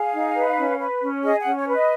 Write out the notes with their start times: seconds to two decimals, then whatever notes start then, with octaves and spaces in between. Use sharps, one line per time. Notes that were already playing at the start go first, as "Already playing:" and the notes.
Already playing: G#4 F5
0.14 D#4
0.36 B4
0.58 C#4
0.80 B4
1.02 C#4
1.23 G#4 D#5
1.40 F#5
1.45 C#4
1.56 C#5
1.67 B4
1.73 D#5